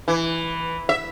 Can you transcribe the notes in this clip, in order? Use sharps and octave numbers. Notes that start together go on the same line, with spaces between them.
E3
E5